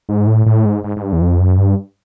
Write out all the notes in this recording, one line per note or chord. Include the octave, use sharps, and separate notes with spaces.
G#2
A2
A2
G#2
G#2
G#2
G2
E2
F2
F#2
G2